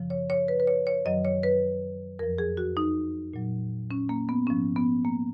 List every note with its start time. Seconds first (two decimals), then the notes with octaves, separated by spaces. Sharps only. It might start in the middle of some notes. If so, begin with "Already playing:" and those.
Already playing: F#2 C#3 F3
0.10 C#5
0.30 C#5
0.48 B4
0.60 B4
0.67 C#5
0.87 C#5
1.06 F#2 D#3 F#3 D#5
1.25 C#5
1.43 B4
2.19 F2 F3 A#4
2.38 G#4
2.57 F#4
2.77 D#4
3.33 A#2 F#3
3.91 C#4
4.09 A#3
4.29 B3
4.47 G#2 F3 C#4
4.76 B3
5.05 A#3